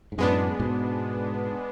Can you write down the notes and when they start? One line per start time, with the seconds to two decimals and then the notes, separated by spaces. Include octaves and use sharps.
0.12 G#2
0.18 F#2 A2 G#3 B3 D4
0.60 G#2 B2